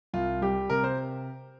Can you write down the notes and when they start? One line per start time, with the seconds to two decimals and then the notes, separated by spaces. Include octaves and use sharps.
0.13 C2 F4
0.42 G3 G4
0.70 C3 A#4
0.84 C5